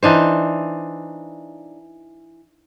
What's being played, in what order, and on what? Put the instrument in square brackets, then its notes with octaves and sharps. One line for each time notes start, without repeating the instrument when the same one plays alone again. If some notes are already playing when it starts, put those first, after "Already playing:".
[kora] E3 D4 D#4 C5